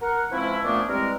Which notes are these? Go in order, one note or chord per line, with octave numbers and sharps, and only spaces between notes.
A#4 F#5
E3 F3 G#3 C4 C#4 E4
A#2 F3 A3 B3 C#4 D4
E3 G3 G#3 C4 A#4